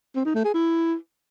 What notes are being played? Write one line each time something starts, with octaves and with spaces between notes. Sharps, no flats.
C4
D#4
A3
G#4
E4